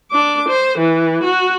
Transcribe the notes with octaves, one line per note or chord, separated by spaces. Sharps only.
D4 D6
C5
E3
F#4